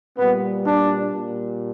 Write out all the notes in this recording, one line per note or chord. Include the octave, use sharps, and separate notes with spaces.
A#2 G3 B3
D4
A#2 G3